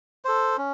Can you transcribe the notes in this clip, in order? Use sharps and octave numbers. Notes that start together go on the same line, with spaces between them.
A4 C5
C#4